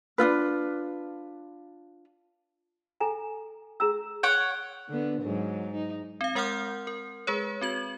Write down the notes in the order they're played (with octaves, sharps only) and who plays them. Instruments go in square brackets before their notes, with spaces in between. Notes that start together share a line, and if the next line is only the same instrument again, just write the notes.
[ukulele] D4 D#4 F4 B4
[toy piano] A4 G#5 A#5
G#4 A#5 E6
[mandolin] C#5 F#5 G5
[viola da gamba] D3 B3
G#2 F#3
D#4
[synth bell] C4 F5
G#3 A#4 F#5 C6 F6 G6
A#4
G#3 G#4 B4 C#5
C4 F#4 G#6 F#7